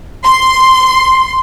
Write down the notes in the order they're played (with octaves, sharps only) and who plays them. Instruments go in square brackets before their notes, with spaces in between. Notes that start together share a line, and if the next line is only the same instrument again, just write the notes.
[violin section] C6